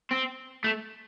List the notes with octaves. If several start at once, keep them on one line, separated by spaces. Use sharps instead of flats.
C4
A3